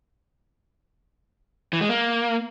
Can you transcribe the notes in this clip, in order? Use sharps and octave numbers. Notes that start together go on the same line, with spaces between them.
E3
G#3
A#3